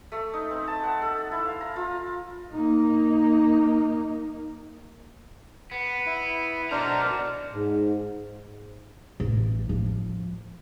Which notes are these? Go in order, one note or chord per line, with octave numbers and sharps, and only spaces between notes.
A3
D#4
C4
A5
F#5
A4
E4
F5
A#5
F4
A#3 D#4
B3
E4
B2 D4 A#4 C5 A#5
G#2
A1
F3